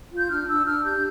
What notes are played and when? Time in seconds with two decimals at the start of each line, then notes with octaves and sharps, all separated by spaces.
0.12 F4
0.17 G6
0.30 D4 F6
0.48 D4 E6
0.66 D4 F6
0.84 G4 G6